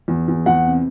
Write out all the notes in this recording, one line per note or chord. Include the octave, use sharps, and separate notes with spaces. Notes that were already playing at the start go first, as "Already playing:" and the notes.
E2
E2
E2 F#5
C3